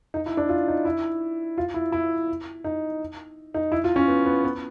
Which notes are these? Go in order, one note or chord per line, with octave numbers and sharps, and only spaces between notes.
D#4
E4
D4
F4
D#4
E4
F4
E4
E4
D#4
D#4
E4
F4
C#4
B3
B3
B3